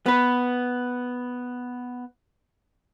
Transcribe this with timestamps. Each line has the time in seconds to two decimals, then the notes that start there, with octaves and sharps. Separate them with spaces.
0.06 B3 B4